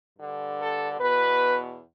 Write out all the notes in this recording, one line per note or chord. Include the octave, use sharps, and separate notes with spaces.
G2 D3
A4
E2 B2 B4